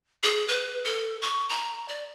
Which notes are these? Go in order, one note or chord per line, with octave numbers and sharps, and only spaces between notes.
G#4
B4
A4
C#6
A#5
D5